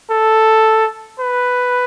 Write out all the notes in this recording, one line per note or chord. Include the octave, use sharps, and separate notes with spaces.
A4
B4